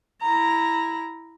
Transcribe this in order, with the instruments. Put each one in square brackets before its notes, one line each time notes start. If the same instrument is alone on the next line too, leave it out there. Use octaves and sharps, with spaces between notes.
[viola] E4 A#5